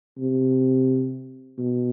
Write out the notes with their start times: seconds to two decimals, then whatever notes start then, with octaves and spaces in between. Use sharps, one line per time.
0.19 C3
1.58 B2